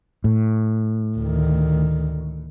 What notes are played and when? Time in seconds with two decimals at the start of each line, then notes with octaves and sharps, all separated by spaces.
0.24 A2
1.18 D2 D#3